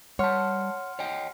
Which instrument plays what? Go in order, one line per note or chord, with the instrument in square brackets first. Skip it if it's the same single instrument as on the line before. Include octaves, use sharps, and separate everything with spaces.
[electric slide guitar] G3 A5 [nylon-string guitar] C#5 [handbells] F#5 C6 F6
[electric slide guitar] C#5 D#5 G5